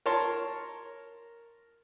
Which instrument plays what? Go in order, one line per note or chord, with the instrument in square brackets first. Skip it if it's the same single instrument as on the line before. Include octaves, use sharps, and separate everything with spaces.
[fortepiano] A#4 C#5 A5 C6